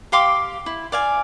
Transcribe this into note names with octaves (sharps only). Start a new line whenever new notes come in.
G4 F5 C6 D6
E4
D5 F5 G#5